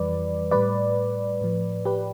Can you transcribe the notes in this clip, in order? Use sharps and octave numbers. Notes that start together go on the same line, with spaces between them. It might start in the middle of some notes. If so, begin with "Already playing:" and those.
Already playing: F2 E3 G3 B4 D5
A2 G3 B4 D5
A2 F3
G4 B4